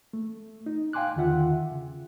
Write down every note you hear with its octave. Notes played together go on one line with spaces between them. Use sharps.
A3
D#4
F5 G5 G#5 C6 D6 F#6
E2 D3 D#3 F4 E5 F#5
C#3